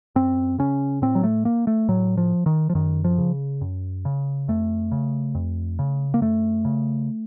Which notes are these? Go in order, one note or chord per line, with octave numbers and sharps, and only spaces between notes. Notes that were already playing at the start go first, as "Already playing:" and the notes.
F#2 C4
C#3 C#4
A2 C4
F#3
A3
A#3
A3
A2 F#3
F3
D#3
F3
F#2 D#3
F3
C#3
F#2
C#3
F2 A3
C#3
F2
C#3
A#3
F#2 A3
C#3